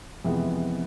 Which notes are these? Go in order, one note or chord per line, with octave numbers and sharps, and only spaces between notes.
F2 C3 E3 G#3 B3